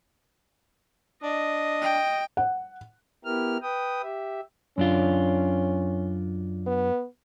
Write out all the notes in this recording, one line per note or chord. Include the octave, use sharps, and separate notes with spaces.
D4 D#5
G5
F#5
B3 E4 G4 A#4 F6
B4 G5 D#6
G4 E5
F#2 C#4 D4 F4
B3